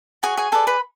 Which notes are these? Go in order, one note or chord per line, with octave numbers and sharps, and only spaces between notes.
F#4 G#4 C#5 G#5
G#4 G#5
G#4 A4 B4 D5 A5
B4 B5